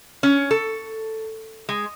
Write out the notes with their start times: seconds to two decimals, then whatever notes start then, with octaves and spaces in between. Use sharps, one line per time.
0.23 C#4
0.51 A4
1.69 G#3